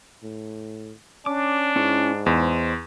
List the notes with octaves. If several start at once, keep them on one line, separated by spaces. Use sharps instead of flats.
A2
C#4 D4 D6
G#2 C#4 E4 C#5
E2 C5 D#5